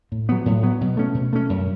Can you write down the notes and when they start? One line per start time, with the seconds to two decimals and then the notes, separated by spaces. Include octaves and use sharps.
0.12 A2
0.29 F#3 B3
0.46 A2
0.63 F#3 B3
0.81 B2
0.97 A3 C#4
1.14 B2
1.33 A3 C#4
1.49 F#2